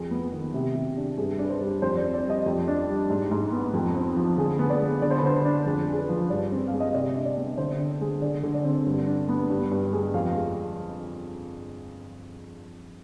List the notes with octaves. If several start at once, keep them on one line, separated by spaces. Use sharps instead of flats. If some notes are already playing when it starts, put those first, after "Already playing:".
Already playing: F2 G#4
B3
D#3
C3
C3
D4
G2 G#4
D4
B4
C5
G3
F2 C5
D5
C4
D5
G3
D#5
F2
D4
G3
G#2
G#2
B3
F2
C4
F3
D3 G#4
B3
D5
G#3
D3 D5
C5
B4
D3 C5
D4
F2 G#4
G#3 G#4
B4
F3
G2 D5
C4
F5
G#3
D#5
C3 D5
D4
D5
B3
D3 C5
D4
G#3
D3 D5
D3
D5
C4
G2
D4
B3
G2
G2
G#3
F2 F5
G#3